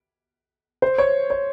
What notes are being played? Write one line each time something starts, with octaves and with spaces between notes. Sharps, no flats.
C5
C#5
C#5